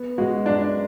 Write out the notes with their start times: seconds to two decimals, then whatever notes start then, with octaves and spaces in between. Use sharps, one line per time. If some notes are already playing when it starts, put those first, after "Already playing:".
Already playing: B3
0.18 G#3 F#4
0.46 F#2 D4